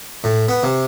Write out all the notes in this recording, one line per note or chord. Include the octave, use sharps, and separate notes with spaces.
A2
B3
C3